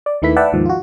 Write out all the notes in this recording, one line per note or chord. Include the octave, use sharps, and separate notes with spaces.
D5
D#2 D#3 A3 E4 B4 B6
B4 D5 E5 F#5 G5 A5
D#2 G#2 D#3 F3
F4 F#4